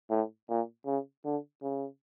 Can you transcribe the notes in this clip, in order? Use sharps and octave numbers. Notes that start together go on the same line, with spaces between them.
A2
A#2
C#3
D3
C#3